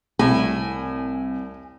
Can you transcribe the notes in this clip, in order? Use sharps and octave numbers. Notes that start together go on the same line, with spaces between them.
C2 A2 G#5